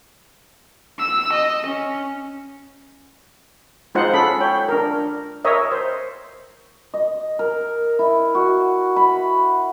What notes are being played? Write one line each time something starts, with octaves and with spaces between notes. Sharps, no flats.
E6
D#5
C#4
G#3 D#4 F4 C5 F#5
C#4 A4 B5
C#5 G5
D4 A#4
A#4 C#5 D#5 E5
C5
D#5
A#4
E4
F#4
B5